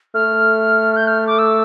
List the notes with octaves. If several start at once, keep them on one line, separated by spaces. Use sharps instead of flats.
A3 F6
G6
F6
D6
E6